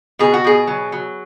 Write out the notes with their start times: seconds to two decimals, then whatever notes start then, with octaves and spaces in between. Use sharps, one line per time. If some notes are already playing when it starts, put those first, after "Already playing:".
0.19 B2 G#4
0.34 F#4
0.44 B2 G#4
0.67 F#3
0.92 F#3